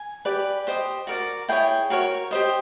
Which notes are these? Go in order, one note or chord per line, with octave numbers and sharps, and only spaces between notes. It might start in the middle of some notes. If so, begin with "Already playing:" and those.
Already playing: G#5
G4 B4 D5
G4 C5 D#5
F#4 A#4 D5
E4 G#4 C#5 G5
F#4 A#4 C#5
G4 C5 D#5